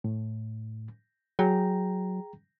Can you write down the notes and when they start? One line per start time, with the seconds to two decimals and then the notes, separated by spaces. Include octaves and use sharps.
0.04 A2
1.39 F#3 G#4 G5 A#5